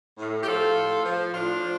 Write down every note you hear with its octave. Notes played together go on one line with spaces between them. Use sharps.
A2
G4
F3 F4 A4
A2
F3
A2 D4 F4
F3